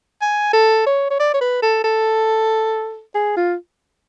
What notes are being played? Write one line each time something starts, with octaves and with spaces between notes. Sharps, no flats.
G#5
A4
C#5
C#5
D5
C#5
B4
A4
A4
G#4
F4